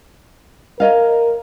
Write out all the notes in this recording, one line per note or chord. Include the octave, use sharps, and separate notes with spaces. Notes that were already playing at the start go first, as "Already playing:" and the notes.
A#4 C#5 D#5 F5